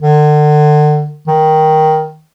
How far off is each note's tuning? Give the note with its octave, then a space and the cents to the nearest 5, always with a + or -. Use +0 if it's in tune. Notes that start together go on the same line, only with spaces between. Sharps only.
D3 +35
D#3 +10